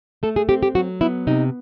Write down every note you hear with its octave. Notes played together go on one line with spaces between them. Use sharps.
A3 A4
G#4
C4 G4
G4
F#3 F#4
B3 E4
C3 D#4